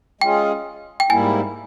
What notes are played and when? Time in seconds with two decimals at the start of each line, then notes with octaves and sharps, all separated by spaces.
0.21 G#3 C#4 F4 G#4 G5
1.00 G5
1.10 G#2 G3 A#3 E4 G#5